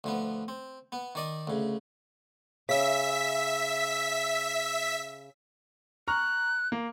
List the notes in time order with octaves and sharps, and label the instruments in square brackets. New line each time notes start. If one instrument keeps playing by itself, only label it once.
[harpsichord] D2 F3 B3
C4
B3
D#3 D5 D#5
D2 C#3
[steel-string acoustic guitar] C#3 [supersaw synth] E5 B6
[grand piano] A#5 C#6 F6 [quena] F#6
[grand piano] A#3